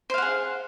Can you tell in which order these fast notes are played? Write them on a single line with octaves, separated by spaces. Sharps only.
C5 F5 F#5 G#4